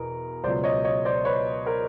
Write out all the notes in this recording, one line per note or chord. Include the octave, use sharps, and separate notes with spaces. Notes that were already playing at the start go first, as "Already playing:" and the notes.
Already playing: E2 B2 A#4
C#2 B2 F#3 C5 D5
C#5 D#5
C#5 D#5
C5 D5
B4 C#5
A#4 C5